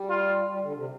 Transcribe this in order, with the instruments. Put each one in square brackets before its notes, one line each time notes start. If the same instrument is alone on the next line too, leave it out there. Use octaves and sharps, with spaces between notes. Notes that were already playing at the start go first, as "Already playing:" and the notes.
Already playing: [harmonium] G3
[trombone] F4
[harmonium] G3
D3
C3